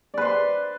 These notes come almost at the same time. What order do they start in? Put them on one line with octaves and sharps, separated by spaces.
D5 B4 C5 C6